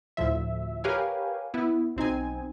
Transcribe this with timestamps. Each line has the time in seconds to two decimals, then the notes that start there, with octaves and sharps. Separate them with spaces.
0.17 D2 A2 F3 E5
0.84 G4 A#4 B4 C#5 F5 G#5
1.54 B3 E4
1.96 B1 C4 D#4 G#5